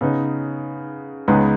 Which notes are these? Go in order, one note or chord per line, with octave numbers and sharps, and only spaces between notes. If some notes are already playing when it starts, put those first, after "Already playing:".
C#3 B3 D#4
C#2 C#3 G#3 B3 D#4